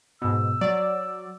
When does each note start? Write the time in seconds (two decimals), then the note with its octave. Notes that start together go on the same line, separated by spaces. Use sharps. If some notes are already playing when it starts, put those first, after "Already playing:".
0.22 G#2 B2 E6
0.61 F#3 D5